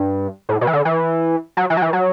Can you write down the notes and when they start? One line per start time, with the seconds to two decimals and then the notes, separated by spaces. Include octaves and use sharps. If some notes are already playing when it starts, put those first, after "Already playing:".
Already playing: G2
0.49 A2
0.61 B2
0.67 E3
0.73 D3
0.85 E3
1.57 F#3
1.70 E3
1.77 F#3
1.82 E3
1.93 F#3